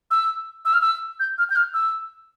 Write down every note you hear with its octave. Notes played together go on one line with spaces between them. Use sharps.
E6
E6
F6
E6
G6
F6
G6
F6
E6